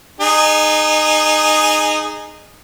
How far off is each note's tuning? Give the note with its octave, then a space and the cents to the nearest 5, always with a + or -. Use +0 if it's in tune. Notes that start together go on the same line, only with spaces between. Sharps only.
D#4 -20 G#4 +0